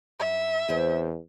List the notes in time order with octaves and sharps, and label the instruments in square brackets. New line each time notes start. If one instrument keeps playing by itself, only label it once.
[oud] F#2 [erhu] E5
[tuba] E2 [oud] C4 G#4 B4